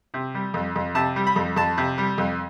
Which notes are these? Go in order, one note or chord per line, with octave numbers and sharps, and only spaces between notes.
C3
G3
F2
F2
C3 A5
G3
B5
F2
F2 A5
C3
G3
F2